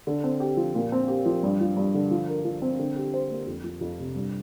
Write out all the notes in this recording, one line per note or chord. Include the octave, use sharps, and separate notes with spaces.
D3
C4
G4
F3
A#2
C4
G4
F3
G2
F3
G2
D3
F3
A#4
F3
C4
D3
G4
C5
A#3
F2
F3
F2
C3
G2